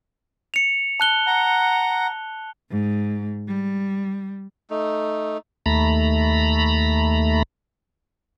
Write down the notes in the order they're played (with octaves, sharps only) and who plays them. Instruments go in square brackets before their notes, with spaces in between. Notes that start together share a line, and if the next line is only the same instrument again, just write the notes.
[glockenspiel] C#7 F7
A5 F#6 G7
[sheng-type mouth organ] F#5 A#5
[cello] G#2
G3
[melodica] A3 D#4
[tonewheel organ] D#2 A3 A#5 B5